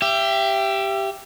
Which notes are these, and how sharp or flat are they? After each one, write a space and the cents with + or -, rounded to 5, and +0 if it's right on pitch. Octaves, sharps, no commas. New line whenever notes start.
G4 +0 E5 +30